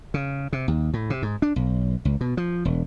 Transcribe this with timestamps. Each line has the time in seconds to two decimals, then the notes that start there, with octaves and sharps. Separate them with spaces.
0.14 C#3
0.53 C3
0.68 D#2
0.94 A2
1.10 C3
1.22 G#2
1.42 D4
1.56 B1
2.05 C#2
2.21 B2
2.37 F3
2.65 E1